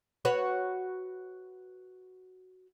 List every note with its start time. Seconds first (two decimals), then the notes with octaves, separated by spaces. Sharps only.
0.25 F#4 B4 C#5